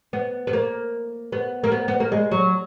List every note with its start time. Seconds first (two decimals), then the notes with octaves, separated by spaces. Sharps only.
0.13 B3
0.47 B3
0.53 A#3
1.32 B3
1.64 A#3
1.72 B3
1.88 B3
2.00 A#3
2.12 G#3
2.31 F#3